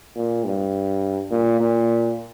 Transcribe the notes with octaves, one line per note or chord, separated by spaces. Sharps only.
A#2
G2
A#2
A#2